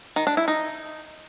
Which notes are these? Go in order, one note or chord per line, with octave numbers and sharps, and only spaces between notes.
D#3
D4
E4
D#4